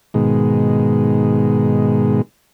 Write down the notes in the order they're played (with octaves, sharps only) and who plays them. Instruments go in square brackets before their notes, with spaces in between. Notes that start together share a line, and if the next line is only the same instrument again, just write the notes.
[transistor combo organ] G#2 B2 D#3 G#3